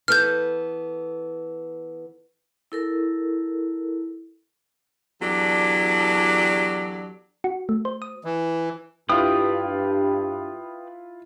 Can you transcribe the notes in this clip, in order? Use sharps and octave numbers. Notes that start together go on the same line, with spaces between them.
E3 B3 A4 F6 G6
E4 A4 A#4
E2 F#3 D4 G4 A4 D5
F#4
A3
C5
D#6
E3
G2 E4 F4 B4 G5 D#6